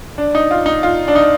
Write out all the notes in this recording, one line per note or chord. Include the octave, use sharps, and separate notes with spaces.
D4
D#4
F4
D#4
F4
D4
D#4